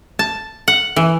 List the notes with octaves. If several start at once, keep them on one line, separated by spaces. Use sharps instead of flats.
A5
F#5
E3